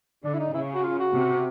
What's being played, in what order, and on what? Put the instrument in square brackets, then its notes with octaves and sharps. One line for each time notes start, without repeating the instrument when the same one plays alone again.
[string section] D3 [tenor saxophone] D4
[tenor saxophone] E4
D#4
[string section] C#3 [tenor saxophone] E4
[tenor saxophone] F#4
F4
F#4
[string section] C3